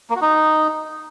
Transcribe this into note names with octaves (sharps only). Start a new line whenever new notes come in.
A#3
F#4
D#4